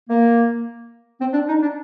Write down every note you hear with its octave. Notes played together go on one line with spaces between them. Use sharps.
A#3
C4
D4
D#4
D4